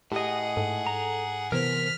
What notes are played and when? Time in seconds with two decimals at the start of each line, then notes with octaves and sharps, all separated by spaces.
0.12 A2 G4 G#4 D#5 F#5
0.57 G#2 A4
0.87 A#5
1.52 C3 E3 B3 A#4 C5 F6 B6